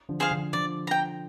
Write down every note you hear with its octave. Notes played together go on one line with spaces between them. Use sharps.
D3 F3
G#4 C5 F5
D3 F3
D3 F3 D5
G5 A#5